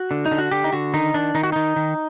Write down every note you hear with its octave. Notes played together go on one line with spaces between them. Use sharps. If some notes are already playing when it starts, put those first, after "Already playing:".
Already playing: F#4
D3
D#4
D3
F#4
D3 G4
D#4
D3 F#4
D#3 D#4
D#3 D4
D#3 D#4
F#4
D#3 D#4
D#3